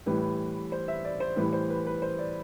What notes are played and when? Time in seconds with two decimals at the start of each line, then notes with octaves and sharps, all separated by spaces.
0.06 A2 E3 G3 B4
0.72 C5
0.88 E5
1.05 D5
1.20 C5
1.36 A2 E3 G3 B4
1.53 C5
1.70 B4
1.86 B4
2.02 C5
2.19 D5